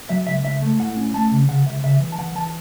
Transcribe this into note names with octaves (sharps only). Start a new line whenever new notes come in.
F#3 E5
C#2 E5
C#2 E5
A3
A2 F#5
C#4
A3 A5
C#3
C#3 F#5
C#2 E5
C#3 E5
E3
A5
E3 F#5
E3 A5